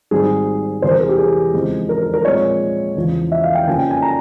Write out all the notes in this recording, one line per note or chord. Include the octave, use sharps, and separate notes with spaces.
G#1 G#2 G3 C4 G#4
E1 E2 C3 C5
A#4
G#4
G4
G#4
F2 C#3 E3 G#3 C4
A#4
A#4
A#4
A#1 A#2 G#3 C4 C#5
E2 C#3 F3
E5
F5
G5
F2 C#3 F3 A#3 C#4 G#5
G5
G#5
A#5